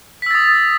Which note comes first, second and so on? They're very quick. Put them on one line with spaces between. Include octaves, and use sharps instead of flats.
B6 E6 A6 D#6